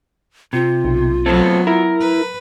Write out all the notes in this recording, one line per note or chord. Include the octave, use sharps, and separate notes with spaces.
C3 F4
B1
F#3 A3 B3 C4 A4
E4 A#4
B4